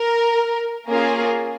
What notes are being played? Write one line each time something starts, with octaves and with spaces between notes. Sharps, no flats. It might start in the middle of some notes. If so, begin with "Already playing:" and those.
Already playing: A#4
A#3 C#4 F4 G#4 A#4